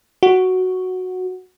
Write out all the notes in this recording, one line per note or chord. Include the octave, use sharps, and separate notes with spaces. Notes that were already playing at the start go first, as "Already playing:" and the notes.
F#4